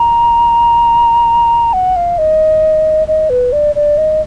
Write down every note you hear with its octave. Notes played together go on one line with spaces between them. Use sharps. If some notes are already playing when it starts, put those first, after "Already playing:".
Already playing: A#5
F#5
F5
D#5
D#5
B4
D5
D5
D#5